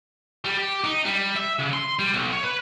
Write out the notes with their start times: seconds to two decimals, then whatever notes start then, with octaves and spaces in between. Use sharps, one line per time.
0.45 G3
0.57 G4
0.84 D#4
1.05 G3
1.36 E5
1.59 C#3
1.73 C6
1.99 G3
2.13 B1
2.32 C#5
2.44 B4